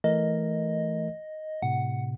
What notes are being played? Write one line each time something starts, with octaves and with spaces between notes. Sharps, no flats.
E3 A3 A#4 D#5
A2 C3 F#5